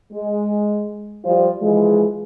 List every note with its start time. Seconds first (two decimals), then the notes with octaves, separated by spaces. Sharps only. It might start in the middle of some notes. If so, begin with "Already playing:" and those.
0.13 G#3
1.25 F3 G3 F4 C5
1.61 E3 F3 G#3